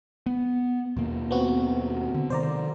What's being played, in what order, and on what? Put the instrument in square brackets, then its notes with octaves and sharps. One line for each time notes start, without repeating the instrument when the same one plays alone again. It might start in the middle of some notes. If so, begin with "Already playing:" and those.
[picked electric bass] B3
D#2 B2 A#3
[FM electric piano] B3 C4 F#4
[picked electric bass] D3
[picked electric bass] C3 D#3 [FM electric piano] C5 D5 A#5